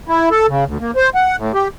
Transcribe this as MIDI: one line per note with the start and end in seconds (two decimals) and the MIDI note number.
0.08 0.29 64
0.31 0.46 69
0.48 0.64 49
0.66 0.78 38
0.81 0.91 58
0.96 1.10 72
1.15 1.36 78
1.37 1.52 45
1.54 1.68 67